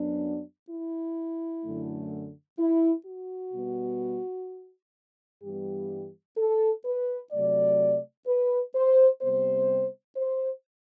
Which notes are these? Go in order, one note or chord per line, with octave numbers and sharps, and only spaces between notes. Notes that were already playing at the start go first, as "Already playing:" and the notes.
Already playing: F#2 F#3 B3 D4
E4
F#2 D3 A3
E4
F#4
B2 G3 B3
G2 E3 G3 B3 G4
A4
B4
C3 F#3 A3 D5
B4
C5
C3 G3 B3 C5
C5